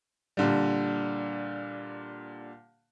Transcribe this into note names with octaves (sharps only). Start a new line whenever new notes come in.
A#2 D3 G3